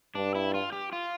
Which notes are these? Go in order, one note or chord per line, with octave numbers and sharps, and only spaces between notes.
G2 D4
E4
F4
G4
F4